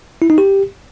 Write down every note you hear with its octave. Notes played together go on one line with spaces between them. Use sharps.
E4
D#4
G4